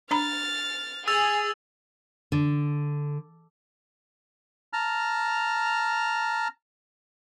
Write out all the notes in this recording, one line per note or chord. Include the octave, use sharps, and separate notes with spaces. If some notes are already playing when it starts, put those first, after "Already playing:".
D4 A#5 B5 F6 A6
G#4 E6 A6 F7
D3
A5 A#5 F6